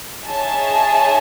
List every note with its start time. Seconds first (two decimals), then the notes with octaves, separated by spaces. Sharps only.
0.25 D#4 G#4 C#5 E5 A5